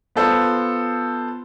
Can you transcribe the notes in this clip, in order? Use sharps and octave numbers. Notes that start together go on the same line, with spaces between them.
B3 F4 A4 C5